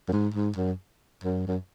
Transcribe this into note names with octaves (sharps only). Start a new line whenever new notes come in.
F#2
G#2
G#2
F#2
F#2
F#2